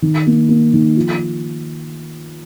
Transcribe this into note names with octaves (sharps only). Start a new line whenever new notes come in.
D#3
A#3
A#3
D#3
F3